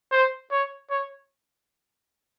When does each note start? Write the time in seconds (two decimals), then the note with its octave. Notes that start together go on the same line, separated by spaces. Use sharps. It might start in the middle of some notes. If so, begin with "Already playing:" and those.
0.12 C5
0.51 C#5
0.90 C#5